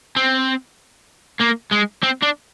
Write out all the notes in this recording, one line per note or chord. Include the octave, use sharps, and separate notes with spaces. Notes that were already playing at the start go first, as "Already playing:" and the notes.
C4
A#3
G#3
C4
D4